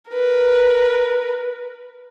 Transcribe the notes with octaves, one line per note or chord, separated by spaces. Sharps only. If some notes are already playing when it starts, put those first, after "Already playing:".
A#4 B4